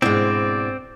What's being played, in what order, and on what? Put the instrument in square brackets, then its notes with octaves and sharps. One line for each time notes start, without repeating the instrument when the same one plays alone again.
[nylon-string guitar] G#2 D4 E4 [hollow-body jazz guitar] B2 G#3 [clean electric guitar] C4 [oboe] D5